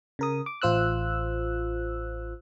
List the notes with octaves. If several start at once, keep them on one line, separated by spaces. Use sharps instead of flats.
C#3 A#4 D#6
D6
A1 F4 C5 E6 F#6